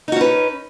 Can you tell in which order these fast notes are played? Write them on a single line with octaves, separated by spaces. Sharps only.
D#4 F#4 C#4 B4